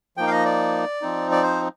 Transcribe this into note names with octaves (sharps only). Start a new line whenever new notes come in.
F3 A#3 D#4 G5
F5
D#5
D5
F3 C4 D#4
D5
C5